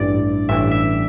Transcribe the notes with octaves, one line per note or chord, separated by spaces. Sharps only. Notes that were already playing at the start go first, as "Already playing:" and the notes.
Already playing: A1 G2 E3 D5
A1 G2 E3 E5
E5